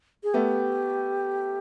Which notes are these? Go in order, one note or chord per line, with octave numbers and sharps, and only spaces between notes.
G#4
A3 B3 G4